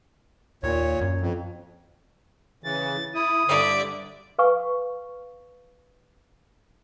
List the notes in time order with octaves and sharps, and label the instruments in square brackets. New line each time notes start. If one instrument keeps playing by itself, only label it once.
[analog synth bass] D#2 [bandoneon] A#2 C#5
[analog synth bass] F#2
[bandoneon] F2
[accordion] C#3 E3 [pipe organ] A6
[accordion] E4 [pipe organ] D#6
[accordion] G2 D3 [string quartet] D5 E5
[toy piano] B4 F5 G#5 C#6